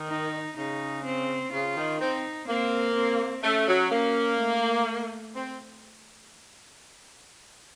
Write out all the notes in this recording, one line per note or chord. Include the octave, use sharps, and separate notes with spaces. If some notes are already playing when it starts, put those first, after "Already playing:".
Already playing: D#3
D#4
C#3 D#4
C4
C#3 F4
D#3
C4 D#4
A#3 C4
C4
A3 C#4
F#3
A#3 C#4
A3
C4